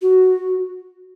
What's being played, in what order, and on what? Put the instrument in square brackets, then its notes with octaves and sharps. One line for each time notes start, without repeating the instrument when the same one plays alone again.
[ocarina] F#4